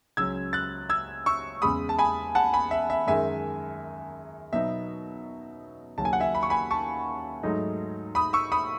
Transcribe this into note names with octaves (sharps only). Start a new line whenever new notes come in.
C#2 C#3 F#3 C#4 E6 G#6
F#6 A6
E6 G#6
C#6 E6
E2 C#3 G#3 B5 D#6
A5
G#5 B5
F#5 A5
G#5 B5
E5
E5
F#2 D#3 G#3 E5 G#5
B2 F#3 B3 D#4 E5
D#2 C#3 F#3 C#4 A5
G#5
F#5
E5 G#5
B5
C#6
G#5 B5
A5 C#6
G#2 F#3 A3 D#4
B5 D#6
C#6 E6
B5 D#6